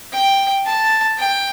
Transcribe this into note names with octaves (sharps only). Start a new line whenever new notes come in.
G5
A5
G5